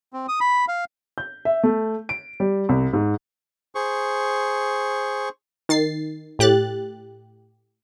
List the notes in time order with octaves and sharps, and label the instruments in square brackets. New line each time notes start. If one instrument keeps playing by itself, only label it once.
[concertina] C4
D#6
B5
F5
[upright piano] G6
E5
A3
D7
G3
C2
G#2
[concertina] G#4 C5 C#6
[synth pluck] D#3 A6 C7
A2 G4 F#6 A6